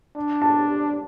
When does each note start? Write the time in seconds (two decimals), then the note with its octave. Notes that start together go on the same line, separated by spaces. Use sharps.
0.16 D4
0.42 A5